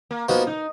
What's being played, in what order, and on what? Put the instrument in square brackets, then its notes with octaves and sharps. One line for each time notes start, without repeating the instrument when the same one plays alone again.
[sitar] A#3
[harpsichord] F3 B3 D#4 F#4 [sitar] A#3
[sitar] D#4